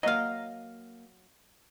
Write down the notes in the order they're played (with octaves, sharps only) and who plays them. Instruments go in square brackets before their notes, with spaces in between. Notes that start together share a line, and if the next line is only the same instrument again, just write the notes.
[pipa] F#3 F5 [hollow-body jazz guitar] A#3 D#5